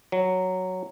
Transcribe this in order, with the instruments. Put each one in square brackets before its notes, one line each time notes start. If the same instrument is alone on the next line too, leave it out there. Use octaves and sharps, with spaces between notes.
[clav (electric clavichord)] F#3